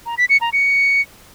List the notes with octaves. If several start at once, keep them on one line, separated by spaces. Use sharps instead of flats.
A#5
B6
C#7
A#5
C#7